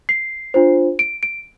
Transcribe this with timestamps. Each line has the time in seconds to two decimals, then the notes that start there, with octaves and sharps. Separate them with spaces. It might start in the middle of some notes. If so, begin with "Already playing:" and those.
0.09 C7
0.54 D4 F4 C5
0.99 D7
1.23 D7